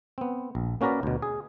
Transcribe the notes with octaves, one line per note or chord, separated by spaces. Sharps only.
B3 C4
A#1
A#3 C#4 F#4 A#4 B4 D5
D2 B2
G#4